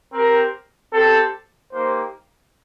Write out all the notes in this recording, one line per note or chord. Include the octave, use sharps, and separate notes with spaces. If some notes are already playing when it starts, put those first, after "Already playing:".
C4 G4 A#4
C4 G4 A4
A#3 D#4 G4 C5